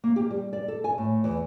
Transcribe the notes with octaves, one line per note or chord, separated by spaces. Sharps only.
A#3
G4
G3
D5
A4
G#5
A2
E2